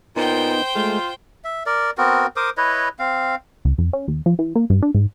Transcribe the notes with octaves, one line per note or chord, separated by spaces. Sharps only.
A#2 B3 D#4 C5 G5
G#3 A3 F4
E5
A#4 D5
B3 C4 F#4 A#4
A#4 C5 D6 D#6
E4 B4 C#5 D#5
C4 F5
C#2
F2
C#4
D#2
F3
E3
A#3
G2
D4
G#2